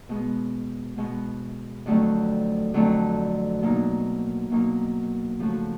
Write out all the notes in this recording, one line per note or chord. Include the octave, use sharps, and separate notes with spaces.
B2 G#3 B3
B2 G#3 B3
F2 D3 F#3 A3 C4
F2 D3 F#3 A3 C4
B2 F#3 A#3 D#4
B2 F#3 A#3 D#4
C#3 F3 A3 C#4 F#4